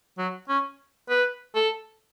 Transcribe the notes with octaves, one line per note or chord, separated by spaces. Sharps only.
F#3
C#4
B4
A4